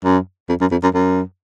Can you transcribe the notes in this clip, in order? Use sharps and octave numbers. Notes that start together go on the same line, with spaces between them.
F#2
F2
F#2
F2
F#2
F#2